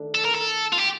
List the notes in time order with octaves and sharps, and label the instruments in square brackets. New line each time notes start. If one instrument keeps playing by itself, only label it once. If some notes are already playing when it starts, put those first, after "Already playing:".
Already playing: [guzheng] D#3 A3 D4
[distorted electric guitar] A4
A#4
A4
F4
G4